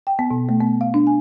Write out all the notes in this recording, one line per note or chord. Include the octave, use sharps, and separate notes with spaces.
G5
B3
B2
A3
B3
F5
D4
G#5